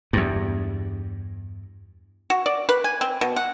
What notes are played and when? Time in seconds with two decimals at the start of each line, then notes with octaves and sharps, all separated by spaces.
0.13 E2 G2
2.30 F#4
2.46 D5
2.69 B4
2.84 G#5
3.01 C4
3.21 B2
3.36 F#5